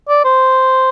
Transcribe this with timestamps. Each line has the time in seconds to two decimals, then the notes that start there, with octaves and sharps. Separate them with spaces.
0.09 D5
0.24 C5